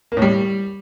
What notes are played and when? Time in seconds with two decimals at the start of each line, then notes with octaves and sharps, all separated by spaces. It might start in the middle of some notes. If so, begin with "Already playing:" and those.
0.12 A#3
0.17 A2
0.22 G3